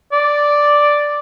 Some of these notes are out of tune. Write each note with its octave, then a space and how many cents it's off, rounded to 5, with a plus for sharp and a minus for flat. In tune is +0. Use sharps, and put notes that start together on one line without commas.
D5 +0